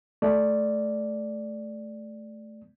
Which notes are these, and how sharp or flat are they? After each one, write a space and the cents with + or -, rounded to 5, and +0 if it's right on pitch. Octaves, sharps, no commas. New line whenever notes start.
A3 -10 D5 +0